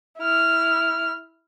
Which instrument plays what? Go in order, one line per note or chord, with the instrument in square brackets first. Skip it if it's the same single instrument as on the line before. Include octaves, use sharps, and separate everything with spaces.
[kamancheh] E4 F6